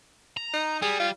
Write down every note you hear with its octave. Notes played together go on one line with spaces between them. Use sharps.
A#5
D#4
G3 G#4
F4